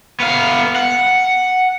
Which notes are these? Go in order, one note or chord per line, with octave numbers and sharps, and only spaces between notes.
B3 F5
F#5